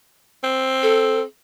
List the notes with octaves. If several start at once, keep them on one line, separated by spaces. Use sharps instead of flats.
C4
A4